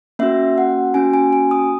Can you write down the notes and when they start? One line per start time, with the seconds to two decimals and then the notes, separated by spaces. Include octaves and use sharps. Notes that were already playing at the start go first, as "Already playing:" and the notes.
0.19 A#3 C#4 F#4 E5
0.58 F#5
0.94 A#3 C#4 F#4 G#5
1.14 G#5
1.33 G#5
1.51 D#6